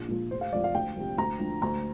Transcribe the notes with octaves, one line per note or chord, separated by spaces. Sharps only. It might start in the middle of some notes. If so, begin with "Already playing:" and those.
Already playing: A#1
A#2 F3
F1 C5
F5
F2 F3 D5
F5
D2 G5
C3 F3
D2 A#5
D3 F3
D2 A#5